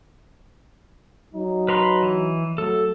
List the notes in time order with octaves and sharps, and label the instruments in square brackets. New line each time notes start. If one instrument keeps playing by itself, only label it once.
[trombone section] F#3 D#4
[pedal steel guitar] B4 A#5 C6
E3
[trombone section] F#3 A3 [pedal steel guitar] A4